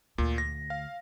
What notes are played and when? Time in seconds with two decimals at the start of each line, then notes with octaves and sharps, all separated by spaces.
0.18 D2 A#2
0.38 A#6
0.70 F5